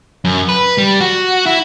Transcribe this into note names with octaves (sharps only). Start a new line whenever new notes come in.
F#2
B4
G3
F#4
E4